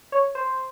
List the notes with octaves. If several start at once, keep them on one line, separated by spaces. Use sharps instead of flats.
C#5
C5